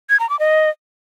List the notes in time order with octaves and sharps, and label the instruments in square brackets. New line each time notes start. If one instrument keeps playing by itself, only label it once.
[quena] G#6
A#5
D6
D#5